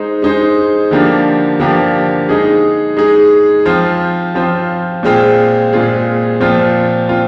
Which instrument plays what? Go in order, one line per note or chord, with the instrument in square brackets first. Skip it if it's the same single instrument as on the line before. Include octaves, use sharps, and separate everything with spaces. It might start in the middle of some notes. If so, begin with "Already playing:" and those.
Already playing: [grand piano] G#3 D#4 C5
G#3 D#4 G#4 C5
D3 F3 A#3 D4 G4
D3 F3 A#3 D4 G4
G#3 D#4 G#4
G#3 D#4 G#4
F3 C4 F4 C5
F3 C4 F4 C5
A#2 G#3 C4 F4 G#4
A#2 G#3 C4 F4 G#4
A#2 F3 C4 F4
C4 F4